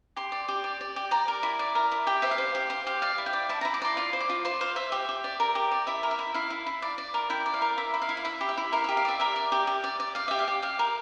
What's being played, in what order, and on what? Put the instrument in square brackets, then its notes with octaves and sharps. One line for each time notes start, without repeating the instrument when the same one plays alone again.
[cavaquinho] G4 C6
D5
G4
D5
D5
G4
D5 A#5
A#4
E4
D5
A#4
E4
G4 G5
C5 E5
F5
C5
G4 F5
C5 F5
G4 F5
D5 F5
E4
G5
D5
E4 A5
E4 A#5
D6
D5 C6
F4 C6
C5
D6
F4
C5 C6
C5 F5
C5 E5
G4 E5
G4
D5
A#4
G4
D5
E4 E5
A#4
E5
E4
E4 F5
E4
E4
D5
D5
A#4
E4 G5
D5
F5
A#4
E4 E5
E4
F5
E4
F5
E4 E5
G4
E5
E4
A#4 F5
G4 E5
F5
D5 E5
A#4 E5
D5
G4
G4
D5
D5
D5 F5
G4 E5
F5
G4
G4 F5
A#4